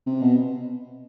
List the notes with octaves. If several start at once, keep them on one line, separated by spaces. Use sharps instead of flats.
C3
B2